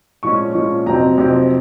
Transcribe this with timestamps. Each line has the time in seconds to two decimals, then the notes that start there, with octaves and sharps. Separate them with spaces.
0.23 A#2 F3 G#3 C#4 C#6
0.54 A#2 F3 G#3 C#4
0.86 F2 C3 F#3 C4 D#4 A#5
1.18 F2 C3 F#3 C4 D#4